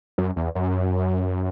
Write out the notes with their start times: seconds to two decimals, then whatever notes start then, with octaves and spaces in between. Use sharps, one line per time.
0.18 F#2
0.36 E2
0.55 F#2